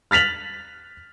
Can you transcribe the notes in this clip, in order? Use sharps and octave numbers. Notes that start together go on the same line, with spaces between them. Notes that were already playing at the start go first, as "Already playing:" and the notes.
F6 A6 B6 F7 F#7